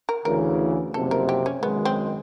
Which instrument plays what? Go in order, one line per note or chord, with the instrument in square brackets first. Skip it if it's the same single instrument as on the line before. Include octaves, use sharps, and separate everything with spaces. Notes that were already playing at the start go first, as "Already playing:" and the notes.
[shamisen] A#4
[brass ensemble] D2 C#3 E3 [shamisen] A#4
[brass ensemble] F#1 F2 C3 [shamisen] A4
[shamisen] A#4
G4
C#4
[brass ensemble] G#1 F#2 D#3 G#3 [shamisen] B3
[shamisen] C4